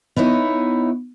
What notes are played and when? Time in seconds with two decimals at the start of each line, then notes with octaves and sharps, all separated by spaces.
0.16 B3 D#4 E4 C#5